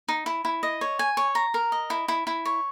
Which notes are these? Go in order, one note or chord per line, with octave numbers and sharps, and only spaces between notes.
D#4
E4
E4
D#5
C#5
G#5
C#5
A#5
A#4
D#5
E4
E4
E4
C#5